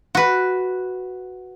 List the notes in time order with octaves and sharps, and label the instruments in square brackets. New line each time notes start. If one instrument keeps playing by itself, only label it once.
[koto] F#4 B4